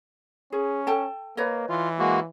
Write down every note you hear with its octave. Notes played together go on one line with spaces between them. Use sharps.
C#4 G#4
A4 G5 A5
A#3 B4 C#5 D#5
E3 F4
G#3 A#3 F#4